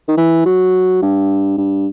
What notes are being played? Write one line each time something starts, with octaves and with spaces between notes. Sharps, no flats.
D#3
E3
F#3
G2
G2